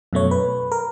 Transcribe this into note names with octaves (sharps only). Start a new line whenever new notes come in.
F#2 B2 A3 C#5
B4
A#4